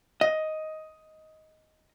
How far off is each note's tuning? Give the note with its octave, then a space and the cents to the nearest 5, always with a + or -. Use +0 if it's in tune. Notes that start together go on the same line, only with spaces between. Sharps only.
D#5 +10